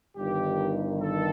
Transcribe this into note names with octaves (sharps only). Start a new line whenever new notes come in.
G1 G2 D#3 G4
A4